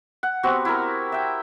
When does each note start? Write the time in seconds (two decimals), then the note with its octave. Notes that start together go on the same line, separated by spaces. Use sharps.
0.23 F#5
0.43 B3 C4 F#4 G4
0.65 E4 A#4
1.12 E5 G5